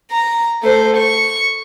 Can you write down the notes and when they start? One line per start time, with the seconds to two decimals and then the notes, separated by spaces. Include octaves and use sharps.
0.12 A#5
0.63 A3 C5
0.97 C#6